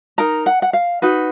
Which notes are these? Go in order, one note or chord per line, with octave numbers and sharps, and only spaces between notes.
D#4 A#4 A#5
F#5
F#5
F5
D#4 F#4 B4